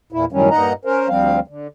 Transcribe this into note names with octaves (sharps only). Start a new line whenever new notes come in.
E2 A#2 E4
F#2 A2 D#3 F#3 G3 C#4
G2 A#2 D#4 D#5 F#5 A#5
C#4 A#4 C5
D2 F3 G3 C4 F5
D3